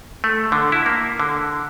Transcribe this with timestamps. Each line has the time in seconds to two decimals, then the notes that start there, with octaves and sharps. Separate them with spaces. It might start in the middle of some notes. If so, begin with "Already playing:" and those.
0.24 A3
0.52 D3
0.72 E4
0.86 A#3
1.20 D3